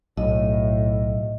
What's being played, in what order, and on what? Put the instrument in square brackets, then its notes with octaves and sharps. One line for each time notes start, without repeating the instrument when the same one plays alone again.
[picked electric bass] B1 [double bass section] A2 [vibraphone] D#5